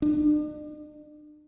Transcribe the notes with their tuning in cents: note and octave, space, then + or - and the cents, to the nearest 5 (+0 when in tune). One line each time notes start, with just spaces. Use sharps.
D4 +45